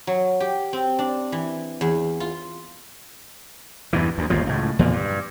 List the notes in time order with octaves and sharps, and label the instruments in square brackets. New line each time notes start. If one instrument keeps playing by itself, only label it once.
[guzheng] F#3
G4
C4
D4
E3
E2
F4
[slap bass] E2 G2 E3
D2
G1 D#2 G#2 F3
C#2 A2
E2 A#2 D3 F3
G2